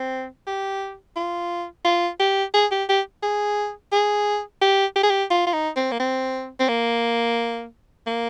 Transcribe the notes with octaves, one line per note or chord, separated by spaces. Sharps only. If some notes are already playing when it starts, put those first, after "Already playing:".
Already playing: C4
G4
F4
F4
G4
G#4
G4
G4
G#4
G#4
G4
G4
G#4
G4
F4
F4
D#4
C4
A#3
C4
C4
A#3
A#3